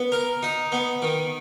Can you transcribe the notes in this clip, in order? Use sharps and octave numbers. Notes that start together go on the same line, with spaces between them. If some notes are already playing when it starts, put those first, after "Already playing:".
Already playing: B3
A#4
D#4
B3
D#3